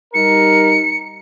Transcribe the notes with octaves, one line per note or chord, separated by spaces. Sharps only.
G3 D#4 A#4 C#7